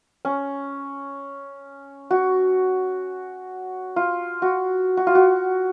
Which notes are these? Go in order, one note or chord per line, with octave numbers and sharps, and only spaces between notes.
C#4
F#4
F4
F#4
F#4
F4
F#4